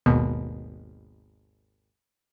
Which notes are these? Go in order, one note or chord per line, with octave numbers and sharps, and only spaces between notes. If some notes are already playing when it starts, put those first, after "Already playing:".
G#1 D#2 B2